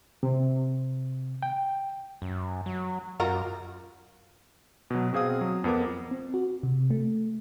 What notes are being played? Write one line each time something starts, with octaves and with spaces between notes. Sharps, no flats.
C3
G5
F#2
F#3
F#2 F4 F#4 A#4
B2 F#3
B2 C4 G#4 F5 D#6
F#3
F2 B3 A#4 D6
C4
F#4
C3
A3